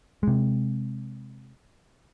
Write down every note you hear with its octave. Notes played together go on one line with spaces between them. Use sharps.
C3 G#3